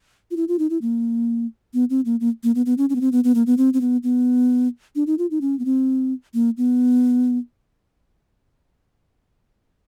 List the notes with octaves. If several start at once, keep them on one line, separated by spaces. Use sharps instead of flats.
F4
E4
F4
D#4
E4
A#3
B3
C4
A#3
A#3
A#3
B3
B3
C#4
C#4
B3
C4
B3
B3
A#3
B3
C4
C4
B3
B3
D4
D#4
F4
D#4
C#4
B3
C4
A#3
B3